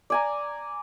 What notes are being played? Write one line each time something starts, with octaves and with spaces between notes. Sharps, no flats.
D5 G#5 A#5